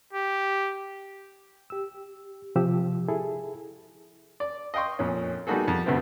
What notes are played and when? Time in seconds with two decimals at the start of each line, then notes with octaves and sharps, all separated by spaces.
0.13 G4
1.70 G4 E6
2.56 C3 F3 G4 E6
3.08 E4 G#4 A4
4.40 D5
4.74 D#5 F5 G5 C6 C#6
4.99 F2 A#2 C#4
5.47 G3 A#3 D#4 F#4 G#4 A4
5.68 F2
5.86 D2 G2 D3 A3 B3 C4